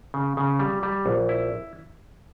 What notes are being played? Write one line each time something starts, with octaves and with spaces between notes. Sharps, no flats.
C#3
C#3
G3
G3
A#1
E4